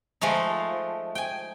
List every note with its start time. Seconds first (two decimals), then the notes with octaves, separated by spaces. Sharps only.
0.21 F3 G#3 A3 D#4
1.15 G5 G#5